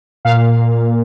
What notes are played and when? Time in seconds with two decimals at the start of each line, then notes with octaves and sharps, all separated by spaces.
0.25 A#2 F5